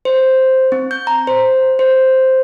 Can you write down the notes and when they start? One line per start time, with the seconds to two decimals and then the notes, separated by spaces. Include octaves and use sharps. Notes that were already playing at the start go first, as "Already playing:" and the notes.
0.05 C5
0.72 C4
0.91 G6
1.07 A#5
1.27 C5
1.79 C5